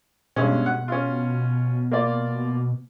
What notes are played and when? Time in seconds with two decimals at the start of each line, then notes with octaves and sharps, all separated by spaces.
0.36 G2 B2 G#3 C#4
0.66 F#5
0.88 C#4 F4
1.91 A#3 F4 D5